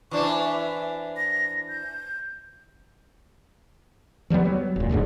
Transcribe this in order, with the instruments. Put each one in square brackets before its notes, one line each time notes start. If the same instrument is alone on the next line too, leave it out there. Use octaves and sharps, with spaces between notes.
[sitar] E3 D4 C5 [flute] C#6
[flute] E5
A#6
G6
[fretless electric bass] F3 G3 A3 B3
F#3
E1 A#2
D1 B1 G#2 D3